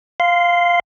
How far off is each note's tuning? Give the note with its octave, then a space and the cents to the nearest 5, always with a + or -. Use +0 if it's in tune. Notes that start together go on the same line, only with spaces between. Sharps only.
F5 +0 C6 -20